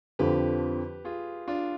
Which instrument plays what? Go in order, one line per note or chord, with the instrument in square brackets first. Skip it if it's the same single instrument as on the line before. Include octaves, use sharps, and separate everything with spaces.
[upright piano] F2 D3 F3 [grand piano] G4 B4
[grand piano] F4 G#4
D4 F4